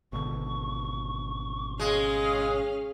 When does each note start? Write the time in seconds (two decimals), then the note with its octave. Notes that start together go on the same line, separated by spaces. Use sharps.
0.13 G#1 B2 D3 C#6
1.79 G#3 C#4 F5 D#6